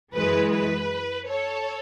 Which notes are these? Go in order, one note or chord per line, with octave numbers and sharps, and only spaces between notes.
F#2 E3 G#3 B4
B4
A4 C#5